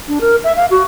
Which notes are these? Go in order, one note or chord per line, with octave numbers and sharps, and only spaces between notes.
D4
A#4
E5
F5
F#4